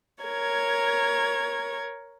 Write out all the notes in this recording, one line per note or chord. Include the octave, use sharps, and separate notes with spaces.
A#4 C#5 G#6